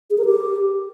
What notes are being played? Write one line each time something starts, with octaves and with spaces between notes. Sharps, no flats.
G#4
A#4
G4